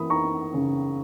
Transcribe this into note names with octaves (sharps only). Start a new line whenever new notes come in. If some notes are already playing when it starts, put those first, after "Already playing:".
Already playing: E3 A#3 B5 D#6
D#4 A#5 C#6
C#3